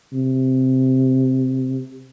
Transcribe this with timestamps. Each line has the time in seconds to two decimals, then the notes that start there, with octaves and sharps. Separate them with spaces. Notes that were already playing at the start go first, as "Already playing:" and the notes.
0.13 C3